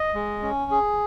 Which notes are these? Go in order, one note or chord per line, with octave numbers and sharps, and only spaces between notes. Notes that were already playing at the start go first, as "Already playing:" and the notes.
Already playing: D#5
G#3
C#4
G#4